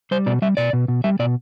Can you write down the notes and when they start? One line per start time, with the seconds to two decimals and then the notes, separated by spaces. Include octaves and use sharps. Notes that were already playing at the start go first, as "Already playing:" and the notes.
0.11 G3 C5
0.26 B2 D5
0.42 G3 E5
0.57 B2 D5
0.73 B2
0.88 B2
1.04 G3 E5
1.19 B2 D5